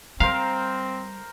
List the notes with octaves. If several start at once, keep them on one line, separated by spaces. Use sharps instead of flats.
G3 C4 A#4 C5 F5